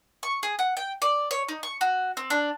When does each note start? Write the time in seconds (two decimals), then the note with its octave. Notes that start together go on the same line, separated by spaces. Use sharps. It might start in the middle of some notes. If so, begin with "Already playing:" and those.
0.23 C#6
0.43 G#4
0.59 F#5
0.77 G5
1.02 D5
1.31 C#5
1.48 D#4
1.63 C#6
1.81 F#4
2.17 C4
2.30 D4